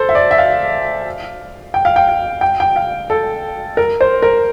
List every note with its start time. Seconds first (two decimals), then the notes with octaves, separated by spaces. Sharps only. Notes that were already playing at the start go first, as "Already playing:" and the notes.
Already playing: A4 C5
0.09 E5
0.15 D5
0.31 E5
0.38 F5
1.74 G5
1.85 F5
1.96 G5
2.08 F5
2.41 G5
2.60 G5
2.76 F5
3.10 A4
3.77 A#4
4.01 C5
4.22 A#4